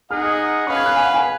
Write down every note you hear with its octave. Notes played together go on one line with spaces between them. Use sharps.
D#4 G#4 D#5 F#5 F6
D#6
C#4 G#4 B4 F5 C#6
G#6
F#6
G#5
F#5
G#5